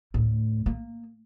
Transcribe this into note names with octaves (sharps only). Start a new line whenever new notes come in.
D2 A2
A#3